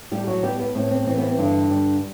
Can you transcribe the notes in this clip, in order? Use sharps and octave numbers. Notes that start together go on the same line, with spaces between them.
A2 G3 G4
F#3 F#4
G3 B3 G4
B3
A2 C4
C4
E3 C4
B3
C4
G2 D3 D4
G3